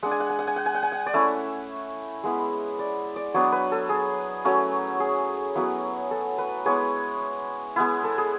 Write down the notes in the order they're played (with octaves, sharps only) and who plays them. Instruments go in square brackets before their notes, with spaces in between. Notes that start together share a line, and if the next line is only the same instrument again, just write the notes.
[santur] G#3 D4 F#5
G#5
F#5
G#5
F#5
G#5
F#5
G#5
F#5
G#5
F#5
D5
A3 C#4 E4 E5
G#3 B3 E4
D5
D5
F#3 B3 D4 C#5
B4
A4
G#4
F#3 A3 C#4
G#4
F#3 B3 E4
A4
B4
G#3 B3 E4 C#5
G#3 B3 E4
A4
G#4